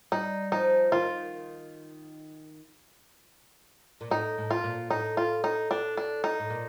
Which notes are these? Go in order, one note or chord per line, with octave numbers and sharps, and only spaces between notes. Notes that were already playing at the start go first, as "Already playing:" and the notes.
G3 D#4
F3 D#4
D#3 F4
A#2
A2 D#4
A2
F4
A#2
A2 D#4
F4
D#4
D4
D4
D#4
A2
A#2